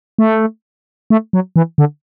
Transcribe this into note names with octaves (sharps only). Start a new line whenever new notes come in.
A3
A3
F#3
E3
D3